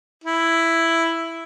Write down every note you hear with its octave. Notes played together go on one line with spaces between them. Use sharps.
E4